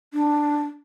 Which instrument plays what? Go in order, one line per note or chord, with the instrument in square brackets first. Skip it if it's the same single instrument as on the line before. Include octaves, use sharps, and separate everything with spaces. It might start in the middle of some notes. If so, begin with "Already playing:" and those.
[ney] D4